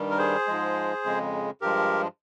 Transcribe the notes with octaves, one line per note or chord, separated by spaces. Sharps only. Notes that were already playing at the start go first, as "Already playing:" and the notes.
Already playing: G2 D#3 G3
A#4
G#4 C5
G#2 F3 G#3
F2 C#3 G#3
G2 F3 G#3 G4 A#4